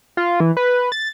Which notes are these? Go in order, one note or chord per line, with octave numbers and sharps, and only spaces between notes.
F4
E3
B4
A6